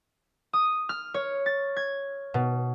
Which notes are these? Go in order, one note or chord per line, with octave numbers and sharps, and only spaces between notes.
D#6
F6
C#5
A6
G#6
B2